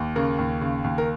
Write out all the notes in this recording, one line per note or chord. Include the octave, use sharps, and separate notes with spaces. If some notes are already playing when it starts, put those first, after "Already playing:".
Already playing: D#2
C#3 A#4
D#2
C#3
D#2
A#4